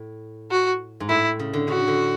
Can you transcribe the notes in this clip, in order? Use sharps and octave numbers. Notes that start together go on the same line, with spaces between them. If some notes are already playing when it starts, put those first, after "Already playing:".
Already playing: A2
F#4
G#2
A2 E4
C#3
D3
C#3 F#4
D3